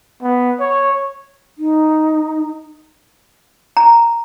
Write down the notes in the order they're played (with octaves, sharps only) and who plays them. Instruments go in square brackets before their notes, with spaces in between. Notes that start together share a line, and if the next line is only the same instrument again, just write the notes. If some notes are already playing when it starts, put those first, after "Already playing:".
[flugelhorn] B3
C#5
[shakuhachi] D#4
[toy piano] A#5